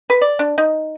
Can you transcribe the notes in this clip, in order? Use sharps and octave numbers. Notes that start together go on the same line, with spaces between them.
B4
D5
D4
D#4